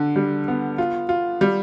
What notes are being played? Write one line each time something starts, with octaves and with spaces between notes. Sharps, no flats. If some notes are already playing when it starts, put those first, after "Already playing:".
Already playing: D3
G3
B3
F4
F4
G3